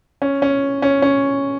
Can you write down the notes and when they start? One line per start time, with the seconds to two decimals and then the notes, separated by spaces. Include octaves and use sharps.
0.22 C#4
0.42 C#4
0.82 C#4
1.02 C#4